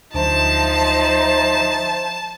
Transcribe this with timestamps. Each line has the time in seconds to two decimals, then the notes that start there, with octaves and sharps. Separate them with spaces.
0.14 D2 F3 D#4 C5 E5 A5